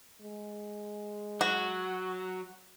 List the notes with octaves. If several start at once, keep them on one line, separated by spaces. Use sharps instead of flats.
G#3
F#3 F#4